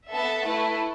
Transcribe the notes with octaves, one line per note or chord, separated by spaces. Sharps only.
B3 A4 E5 A5
A3 E4 B4